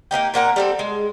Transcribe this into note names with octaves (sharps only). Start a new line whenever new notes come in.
A#3 B3 D#4 G4
A#2 A#3 F#5 A#5
G3 C4 A4
G#3